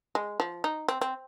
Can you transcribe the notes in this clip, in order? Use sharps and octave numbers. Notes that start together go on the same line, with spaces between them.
G#3
F3
D#4
C4
C4